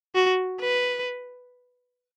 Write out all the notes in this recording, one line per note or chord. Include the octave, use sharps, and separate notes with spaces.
F#4
B4